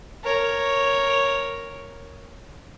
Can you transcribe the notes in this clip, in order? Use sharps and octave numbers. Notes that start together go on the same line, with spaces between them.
A#4 C#5